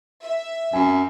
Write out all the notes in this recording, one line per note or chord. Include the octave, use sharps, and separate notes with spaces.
E5
F#2 G#5